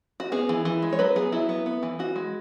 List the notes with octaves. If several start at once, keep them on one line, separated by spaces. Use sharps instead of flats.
F#4
B3 G#4
E3
E3
G#3
C#5
F#3 B4
B3 G#4
F#3 E4
B3
B3
E3
E3 F#4
G#3